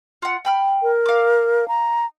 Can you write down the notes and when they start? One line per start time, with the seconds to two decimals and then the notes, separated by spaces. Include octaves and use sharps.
0.22 F4 F#5
0.45 G5 B5 F6
0.83 A#4
1.06 F5 D6
1.68 A#5